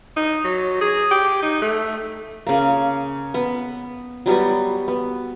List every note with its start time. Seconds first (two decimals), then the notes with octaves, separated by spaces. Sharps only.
0.17 D#4
0.45 F#3
0.81 G#4
1.11 G4
1.42 D#4
1.62 A3
2.47 C#3 A#3
3.34 B3
4.26 F#3 G3 B3 F#4
4.88 B3